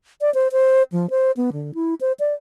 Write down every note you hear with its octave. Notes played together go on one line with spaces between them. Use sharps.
D5
C5
C5
F3
C5
B3
D3
E4
C5
D5